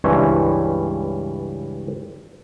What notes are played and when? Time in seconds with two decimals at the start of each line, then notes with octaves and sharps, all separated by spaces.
0.04 C#2 G2 E3 C#4 C5 C#5